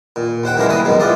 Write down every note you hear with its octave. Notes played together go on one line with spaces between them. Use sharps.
A#2
D#2 C5 F#5 G5
C#3 E3 F#3 G#3 D4 A#4
E3 G3 A#3 B4 D#5 D#6
F#2 B2 D#3 G#3
E3 G#3 F4 D5 D#5